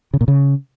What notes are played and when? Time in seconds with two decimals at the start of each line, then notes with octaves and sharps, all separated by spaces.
0.14 C#3
0.21 A#2
0.28 C#3